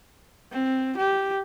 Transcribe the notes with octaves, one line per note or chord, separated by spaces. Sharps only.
C4
G4